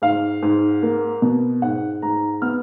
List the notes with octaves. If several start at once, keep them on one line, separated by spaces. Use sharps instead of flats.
G#2 F5
G#2
A#3
B2
G#2 F#5
G#2 A#5
B3 F6